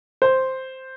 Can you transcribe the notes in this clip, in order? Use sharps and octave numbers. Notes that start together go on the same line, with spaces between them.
C5